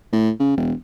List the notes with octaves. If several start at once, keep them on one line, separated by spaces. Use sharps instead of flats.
A2
C#3
E1